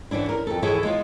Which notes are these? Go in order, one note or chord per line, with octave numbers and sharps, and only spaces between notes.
D3 E3 C#4 D4 E4
A#4
F2 A4
E3 E4 G#4 A4 B4 C#5
G#3 B3 E4 F4